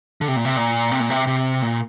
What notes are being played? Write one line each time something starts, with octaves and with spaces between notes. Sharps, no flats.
D3
C3
A#2
C3
A#2
C3
A#2
C3
C3
A#2